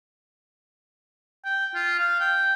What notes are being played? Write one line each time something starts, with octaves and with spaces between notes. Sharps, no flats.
G5
F4
F5
G5